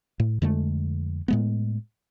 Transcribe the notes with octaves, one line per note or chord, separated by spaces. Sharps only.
A2
F2 D3 G#3 A3
A2 G#3 B3